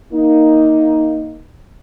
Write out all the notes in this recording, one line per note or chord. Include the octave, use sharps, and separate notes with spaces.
A#3 D#4